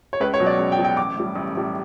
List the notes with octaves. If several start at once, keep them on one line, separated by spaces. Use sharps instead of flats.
C#5
C#2 B4
C#5
B2 F#3
D5
C#2
G5
B2 F#3
G5
A1 D6
A2 G3
A1
A2 G3